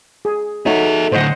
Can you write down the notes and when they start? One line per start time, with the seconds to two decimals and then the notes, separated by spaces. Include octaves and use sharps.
0.25 G#4
0.66 D#4 F#4 G#4 A4 C#5 E5
1.12 A2 D3 C5 D#5 F#5